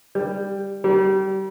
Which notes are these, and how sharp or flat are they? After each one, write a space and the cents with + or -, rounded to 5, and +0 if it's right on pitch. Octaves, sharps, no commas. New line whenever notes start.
G3 +10
G3 -30